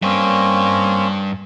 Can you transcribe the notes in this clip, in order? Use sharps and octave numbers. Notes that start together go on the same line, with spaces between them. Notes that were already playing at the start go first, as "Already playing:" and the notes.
G2 G3 A#3 C4 C#4